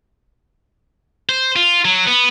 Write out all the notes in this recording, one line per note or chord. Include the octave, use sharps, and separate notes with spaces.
C5
F4
F#3
B3